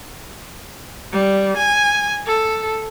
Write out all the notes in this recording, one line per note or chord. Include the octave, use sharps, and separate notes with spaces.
G3
G#5
A4